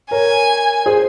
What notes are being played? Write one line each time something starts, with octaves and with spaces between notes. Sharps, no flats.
A#4 C#5 G#5
G#4 C5